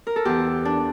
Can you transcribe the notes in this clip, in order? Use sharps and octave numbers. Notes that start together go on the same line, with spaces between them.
A#4
A4
E2 E3 G4
D4